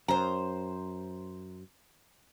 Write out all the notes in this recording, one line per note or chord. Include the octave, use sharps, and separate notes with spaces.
F#2 C5 A#5